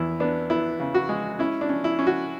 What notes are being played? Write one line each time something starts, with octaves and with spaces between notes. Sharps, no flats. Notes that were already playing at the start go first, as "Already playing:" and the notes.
Already playing: E2 B3 E4
B3 D4
B3 E4
C#3
F#4
G#3
C#4 E4
D4
C#4
E4
C#4
F#4